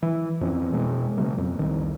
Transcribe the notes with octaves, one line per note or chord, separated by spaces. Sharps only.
E3
F2 E3 C4 C#4
B2 G#3
C#3 F#3 A#3
F2
C2 D#3